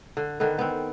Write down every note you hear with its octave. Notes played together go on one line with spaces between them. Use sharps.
D3
D3 D#3 B3
B3 C4